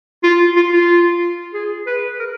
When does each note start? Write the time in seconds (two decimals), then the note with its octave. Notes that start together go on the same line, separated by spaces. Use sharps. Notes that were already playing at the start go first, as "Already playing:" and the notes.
0.23 F4
0.56 F4
0.73 F4
1.54 G#4
1.87 B4
2.19 A#4